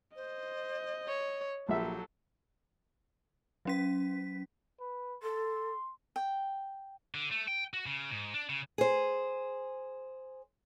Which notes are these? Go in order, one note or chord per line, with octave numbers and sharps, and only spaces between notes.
C5 D#5
C#5
A#1 F#3 G4 A4 E5
F#3 C#4 B6
B4
A4 C6
G5
D3
A3
G5
F#4
C#3
G#2
D4
C#3
G#4 C5